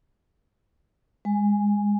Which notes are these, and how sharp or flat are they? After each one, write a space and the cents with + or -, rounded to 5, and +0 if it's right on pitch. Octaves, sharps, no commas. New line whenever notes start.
G#3 -25 G#5 +0